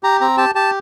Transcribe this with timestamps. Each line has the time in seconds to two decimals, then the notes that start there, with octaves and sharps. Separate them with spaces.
0.03 G4 A#5
0.21 C4 A#5
0.37 G4 A5
0.55 G4 A5